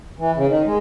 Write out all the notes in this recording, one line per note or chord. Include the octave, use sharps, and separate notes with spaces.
E3
C#3
D#3
G#3